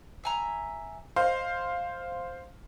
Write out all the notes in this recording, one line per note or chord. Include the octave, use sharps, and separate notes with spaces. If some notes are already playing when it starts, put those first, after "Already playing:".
E5 G#5 A#5
C5 D#5 F5